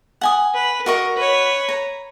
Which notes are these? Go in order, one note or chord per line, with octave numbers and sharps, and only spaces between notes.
F#5 G#5 D#6
B4
F#4 A#4 D#5 C#6
B4 C#5
A#5